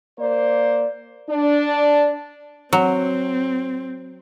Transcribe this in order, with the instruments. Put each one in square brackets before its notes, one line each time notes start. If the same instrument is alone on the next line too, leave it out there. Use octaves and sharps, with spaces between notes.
[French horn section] A#3 C5 D5
D4
[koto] F#3 [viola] C4